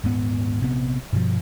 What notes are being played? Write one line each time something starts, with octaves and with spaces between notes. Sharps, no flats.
D#1 G#2 B3
A#1 C3 B3
G2 B2 F3